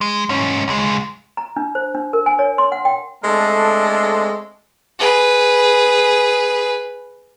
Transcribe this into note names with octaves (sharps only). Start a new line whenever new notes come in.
G#3
G#2 C#4
C#2 G#3
A#5
D4
C5
D4
A#4
G#5
C#5
C6
F#5
G5
G#3 A3 C4 D4 A4
G#4 B4